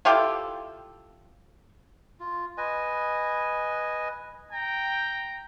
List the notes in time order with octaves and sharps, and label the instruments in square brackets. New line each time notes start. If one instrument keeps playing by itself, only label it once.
[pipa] E4 F4 G4 A4
[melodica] F4
B4 D#5 G#5
[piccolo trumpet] G5 [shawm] A#5